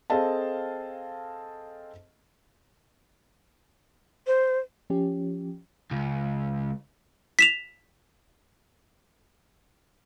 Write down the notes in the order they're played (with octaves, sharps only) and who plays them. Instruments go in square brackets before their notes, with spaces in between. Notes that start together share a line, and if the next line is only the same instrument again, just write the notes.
[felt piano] C4 G#4 A4 D#5 F5 A5
[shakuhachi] C5
[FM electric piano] F3 C#4 G4
[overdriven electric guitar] C#2
[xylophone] B6 E7 F7